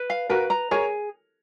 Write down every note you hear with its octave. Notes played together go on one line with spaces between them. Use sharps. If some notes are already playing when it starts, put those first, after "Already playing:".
Already playing: B4
F5
F#4 A#4 B4
A#5
G#4 A#4 C#5